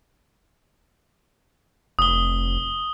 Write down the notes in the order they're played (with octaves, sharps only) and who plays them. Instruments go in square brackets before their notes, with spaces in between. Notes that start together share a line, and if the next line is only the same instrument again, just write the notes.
[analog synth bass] F1 [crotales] D#6 G7